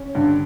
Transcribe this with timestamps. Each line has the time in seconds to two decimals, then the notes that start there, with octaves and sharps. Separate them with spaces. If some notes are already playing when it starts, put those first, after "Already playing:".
Already playing: C#4
0.15 G2 D3